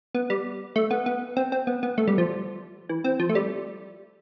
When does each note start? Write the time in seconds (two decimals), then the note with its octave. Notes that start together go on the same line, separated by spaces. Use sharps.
0.15 B3
0.30 G3
0.76 A3
0.91 B3
1.06 B3
1.37 C4
1.52 C4
1.67 B3
1.83 B3
1.98 A3
2.07 G3
2.18 F3
2.89 E3
3.04 C4
3.20 F3
3.29 A3
3.35 G3